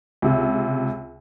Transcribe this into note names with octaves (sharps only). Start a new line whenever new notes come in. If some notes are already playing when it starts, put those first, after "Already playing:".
C#2 C3